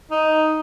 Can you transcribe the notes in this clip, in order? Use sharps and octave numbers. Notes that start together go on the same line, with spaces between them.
D#4